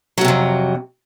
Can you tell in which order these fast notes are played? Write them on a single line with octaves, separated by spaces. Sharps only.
F#3 A2 C3 F2